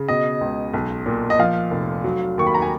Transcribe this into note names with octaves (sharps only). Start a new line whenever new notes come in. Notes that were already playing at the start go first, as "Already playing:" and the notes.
Already playing: C#3
B2 D#5
C#2
B1
A#2
D#5
F3 F5
F1
F#3
D#2 C#6
B5
A#5
G#5